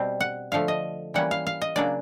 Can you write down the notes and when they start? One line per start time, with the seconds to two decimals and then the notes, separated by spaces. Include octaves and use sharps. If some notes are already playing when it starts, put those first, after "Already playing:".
Already playing: B2 G3 C4
0.21 F#5
0.52 D3 F3 A3 F5
0.68 D#5
1.14 E3 G3 A#3 C#4 F#5
1.31 F5
1.47 F5
1.62 D#5
1.76 C#3 F#3 A#3 D4 D5